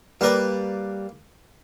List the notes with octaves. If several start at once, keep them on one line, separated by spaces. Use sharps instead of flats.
G3 A#3 A#4 B4 D5